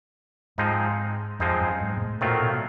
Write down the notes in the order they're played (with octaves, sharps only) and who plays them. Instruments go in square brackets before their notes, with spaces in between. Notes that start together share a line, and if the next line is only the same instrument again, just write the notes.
[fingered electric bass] G#2 [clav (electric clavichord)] F3 G#3 C4 D#4
[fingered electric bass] F2 [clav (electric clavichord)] F3 G#3 C4 D#4
[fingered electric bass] F#2
G#2
A#2
A2
[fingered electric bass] A#2 [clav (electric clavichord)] D#3 F#3 A3 C4 F4
[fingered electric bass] B2